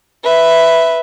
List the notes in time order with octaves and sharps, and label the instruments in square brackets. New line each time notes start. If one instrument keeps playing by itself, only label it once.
[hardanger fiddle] B4 E5